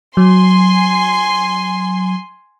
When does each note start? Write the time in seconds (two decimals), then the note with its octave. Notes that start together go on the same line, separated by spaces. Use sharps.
0.17 F#3 G#5 C6